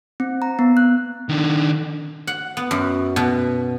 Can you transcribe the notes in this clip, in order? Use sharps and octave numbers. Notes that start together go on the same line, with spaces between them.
C4
A#5
B3
F#6
D#3 D4
F#5
B3
F#2
B2